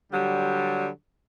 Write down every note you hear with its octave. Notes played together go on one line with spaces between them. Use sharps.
D3 F#3 G3